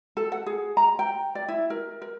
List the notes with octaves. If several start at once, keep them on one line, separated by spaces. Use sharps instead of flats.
A4
F#5
G#4
A#5
G5
D5
E4
A#4
A#4